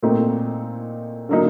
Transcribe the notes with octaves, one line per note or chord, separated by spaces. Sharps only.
A#2 A3 C4 D#4
D3 F#3 A#3 D#4